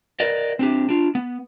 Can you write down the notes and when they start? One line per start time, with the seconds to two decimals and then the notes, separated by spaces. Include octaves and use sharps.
0.20 A#4 B4 D5 D#5
0.59 C4 D4 G4
0.89 D4 F4
1.15 B3